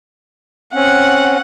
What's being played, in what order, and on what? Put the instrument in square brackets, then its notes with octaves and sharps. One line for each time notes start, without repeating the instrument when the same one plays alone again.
[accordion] C4 C#4 [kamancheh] F#5